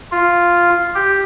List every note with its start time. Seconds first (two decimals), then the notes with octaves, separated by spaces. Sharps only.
0.12 F4
0.95 G4